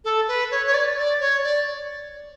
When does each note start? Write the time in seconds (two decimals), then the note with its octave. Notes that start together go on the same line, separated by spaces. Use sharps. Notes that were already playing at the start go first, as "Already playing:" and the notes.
0.05 A4
0.28 B4
0.51 C#5
0.67 C#5
0.74 D5
0.97 D5
1.21 C#5
1.44 D5